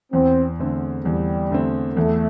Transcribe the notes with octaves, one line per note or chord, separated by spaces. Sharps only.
E2 C4
D3 A3 C4
E2 G3
D3 A3 C4
E2 A3